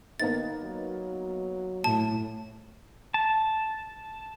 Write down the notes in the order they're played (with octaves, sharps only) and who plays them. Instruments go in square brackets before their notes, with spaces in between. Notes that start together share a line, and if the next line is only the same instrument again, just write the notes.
[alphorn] D#3 [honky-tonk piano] A#3 B3 D#4 [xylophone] A6
[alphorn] F#3
[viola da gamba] A2 [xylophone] A5
[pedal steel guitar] A5